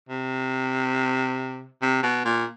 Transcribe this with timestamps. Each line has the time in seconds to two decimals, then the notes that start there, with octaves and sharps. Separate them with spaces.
0.09 C3
1.82 C3
2.03 B2
2.25 A#2